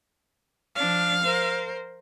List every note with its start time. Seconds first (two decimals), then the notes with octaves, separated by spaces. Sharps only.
0.75 F3 D4 F5
1.24 A#4 C5